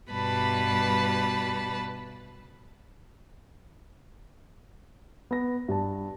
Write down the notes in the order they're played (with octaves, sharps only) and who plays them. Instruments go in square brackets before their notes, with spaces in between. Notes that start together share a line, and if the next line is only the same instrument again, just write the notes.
[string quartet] G2 B2 G3 B4 A5 B5
[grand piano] B3 A#6
G2 A5